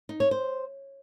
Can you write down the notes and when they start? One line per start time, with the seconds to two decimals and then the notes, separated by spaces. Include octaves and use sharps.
0.09 D#4
0.20 C#5
0.31 C5